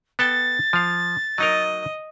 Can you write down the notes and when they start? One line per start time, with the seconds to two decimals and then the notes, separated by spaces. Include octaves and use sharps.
0.19 B3 A4 G5 A6
0.73 F3 F5
1.38 F#3 D#4 A#4 D#5